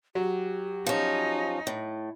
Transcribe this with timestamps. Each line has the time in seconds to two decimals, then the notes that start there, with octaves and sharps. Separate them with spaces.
0.15 F#3 G4
0.86 F3 C#4 D#4
1.67 A2